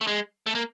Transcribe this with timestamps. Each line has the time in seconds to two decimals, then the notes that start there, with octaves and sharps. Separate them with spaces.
0.01 A3
0.07 G#3
0.46 A3
0.55 A#3